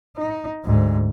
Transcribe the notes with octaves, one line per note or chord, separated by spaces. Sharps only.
D#4
D2 G#2